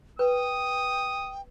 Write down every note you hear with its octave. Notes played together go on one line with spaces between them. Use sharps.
B4 G5 D#6